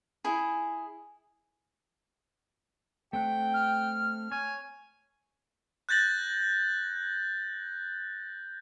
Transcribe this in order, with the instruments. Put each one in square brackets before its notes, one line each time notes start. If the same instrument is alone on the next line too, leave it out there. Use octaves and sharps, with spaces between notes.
[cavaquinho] E4 G#4
[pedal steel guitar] A3 C4 F#5 [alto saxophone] G5
[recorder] F6
[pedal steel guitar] C#5 [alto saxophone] G#5
[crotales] F#6 G6 A6 A#6 F#7